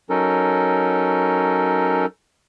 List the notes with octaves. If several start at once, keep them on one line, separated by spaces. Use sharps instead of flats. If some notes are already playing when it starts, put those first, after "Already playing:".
F#3 C#4 D#4 A4 A#4